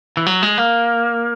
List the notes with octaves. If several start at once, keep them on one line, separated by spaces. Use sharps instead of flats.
E3
F#3
G#3
A#3